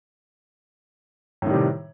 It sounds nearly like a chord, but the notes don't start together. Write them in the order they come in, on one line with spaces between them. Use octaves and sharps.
A2 D#3 G3 C3